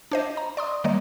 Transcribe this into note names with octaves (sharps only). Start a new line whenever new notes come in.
D4 C5 D#5
A#5
D5 C6 D#6
D#3 G3 A#3 C#5 D#5